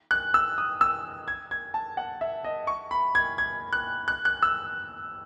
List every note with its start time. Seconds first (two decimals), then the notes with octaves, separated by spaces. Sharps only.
0.11 F#6
0.34 E6
0.58 D#6
0.81 E6
1.28 G#6
1.51 G#6
1.74 A5
1.97 F#5
2.21 E5
2.44 D#5
2.67 C#6
2.91 B5
3.15 G#6
3.38 G#6
3.73 F#6
4.08 F#6
4.25 F#6
4.42 E6